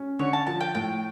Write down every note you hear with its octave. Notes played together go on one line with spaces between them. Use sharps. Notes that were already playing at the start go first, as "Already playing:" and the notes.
Already playing: C#4
D3 C#5
A5
F3 A5
G5
A2 G5